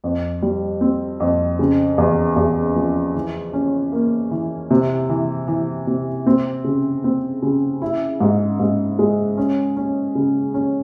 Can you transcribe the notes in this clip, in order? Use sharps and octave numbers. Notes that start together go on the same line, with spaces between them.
F2
G3
C4
F2
C#3
E2
E2
F3
E3
C#4
A#3
E3
C3
E3
E3
C3
C4
C#3
C4
C#3
E4
G#2
G#2
G#3
C#4
C#4
C#3
C#4